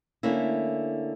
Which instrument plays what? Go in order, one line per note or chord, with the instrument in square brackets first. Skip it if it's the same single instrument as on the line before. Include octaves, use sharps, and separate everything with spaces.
[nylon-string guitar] D3 A3 A#3 C#4 E4